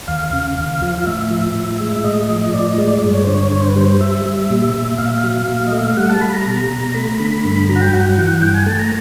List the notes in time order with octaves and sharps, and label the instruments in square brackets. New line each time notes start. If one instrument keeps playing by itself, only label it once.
[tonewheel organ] D#2 F5
C#3
D#2
F3
F5
A2 E5
F3
A2
G#3
E5
A2 D#5
F3
A2 D5
D#5
G#3 D5
G2 D5
C#5
D3 C5
C#5
G2 C#5
C5
B4
G3 C5
G3 E5
G3
A#2
A#2
A#2 F5
E5
F5
F#3
A#2
D#5
A3 E5
F5
G3 F#5
A5
G3 B5
A#5
B2
B2
A3 B5
A#5
B5
D3
G2 B5
B5
F#3 A#5
F#5
G5
G2 F#5
G5
F#5
E3 G5
F#5
G2 G5
G#5
A3 A5
A#5